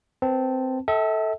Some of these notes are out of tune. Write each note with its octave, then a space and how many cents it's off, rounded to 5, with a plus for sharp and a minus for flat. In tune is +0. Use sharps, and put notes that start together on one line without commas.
C4 -10 B4 -15 A5 +0
A4 +0 E5 -40 G5 +0